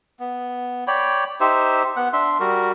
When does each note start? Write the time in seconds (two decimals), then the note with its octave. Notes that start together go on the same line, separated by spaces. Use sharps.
0.20 B3
0.87 C#5 D5 G5 B5
1.40 D#4 G4 C5 E5
1.96 B3 F#5
2.13 D4 E5 C6
2.40 G3 F#4 A#4